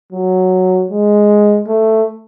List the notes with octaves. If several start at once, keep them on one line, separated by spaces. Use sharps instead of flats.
F#3
G#3
A3